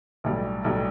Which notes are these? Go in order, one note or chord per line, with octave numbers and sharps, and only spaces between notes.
B1 A2 G3
B1 A2 G3